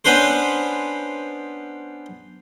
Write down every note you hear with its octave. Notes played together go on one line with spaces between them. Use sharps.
B3 C#4 D4 B4 C5